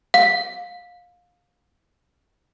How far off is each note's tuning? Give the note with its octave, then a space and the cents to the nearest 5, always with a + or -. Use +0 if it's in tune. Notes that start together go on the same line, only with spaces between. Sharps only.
F5 +25